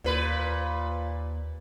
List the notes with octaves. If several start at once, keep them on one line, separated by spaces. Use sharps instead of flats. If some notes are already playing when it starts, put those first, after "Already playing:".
D#2 A#2 B4